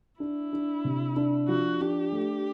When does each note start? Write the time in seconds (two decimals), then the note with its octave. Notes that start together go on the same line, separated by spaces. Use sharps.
0.20 D4 E4
0.53 D4
0.85 C3
1.16 D4
1.48 F3 F#4
1.81 D4 G4
2.12 A3